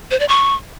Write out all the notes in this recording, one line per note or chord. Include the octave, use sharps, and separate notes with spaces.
C5
D5
C#6